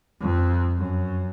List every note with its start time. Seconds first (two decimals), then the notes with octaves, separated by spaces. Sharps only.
0.20 F2
0.77 F#2